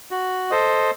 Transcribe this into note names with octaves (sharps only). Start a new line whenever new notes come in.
F#4
A4 C5 D#5